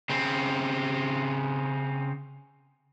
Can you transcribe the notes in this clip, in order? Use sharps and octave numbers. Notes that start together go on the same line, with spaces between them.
C#3 C4